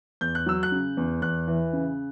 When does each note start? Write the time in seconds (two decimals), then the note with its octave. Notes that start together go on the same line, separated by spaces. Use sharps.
0.21 E2 G6
0.35 F#6
0.46 F#3 E6
0.63 F#6
0.72 C#3
0.97 E2
1.22 E2 F#6
1.48 E3
1.73 C#3